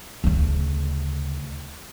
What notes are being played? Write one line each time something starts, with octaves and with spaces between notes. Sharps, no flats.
D2 C#3